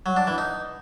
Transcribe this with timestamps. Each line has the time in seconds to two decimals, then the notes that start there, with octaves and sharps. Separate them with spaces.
0.06 F#3
0.17 D4
0.27 E3
0.38 D#4